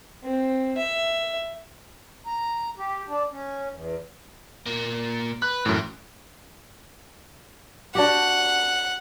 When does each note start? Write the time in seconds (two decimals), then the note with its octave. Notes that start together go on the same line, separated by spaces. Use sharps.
0.24 C4
0.77 E5
2.26 A#5
2.78 G4
3.08 D4
3.31 C#4
3.72 E2
4.66 A#2 A#3
5.42 B4 F#6
5.66 F#2 A2 E3
7.95 D4 F#4 G4 F#5